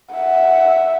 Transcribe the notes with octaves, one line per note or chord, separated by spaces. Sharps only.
E5 F#5